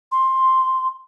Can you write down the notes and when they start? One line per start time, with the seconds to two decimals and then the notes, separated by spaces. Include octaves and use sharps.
0.12 C6